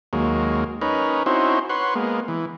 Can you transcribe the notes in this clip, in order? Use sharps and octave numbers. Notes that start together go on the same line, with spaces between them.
D#2 F#3 G#3 A#3
C#4 D#4 A#4 B4
C4 C#4 D#4 E4 F#4 C5
B4 C#5 F#5 C6
G#3 A#3 B3
E3